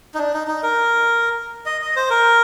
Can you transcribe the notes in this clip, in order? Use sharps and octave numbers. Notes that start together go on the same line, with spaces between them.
D#4
D4
D#4
D#4
A#4
D#5
D#5
C5
A#4